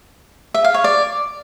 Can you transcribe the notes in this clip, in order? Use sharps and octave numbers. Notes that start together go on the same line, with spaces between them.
E5
F5
C#5
D5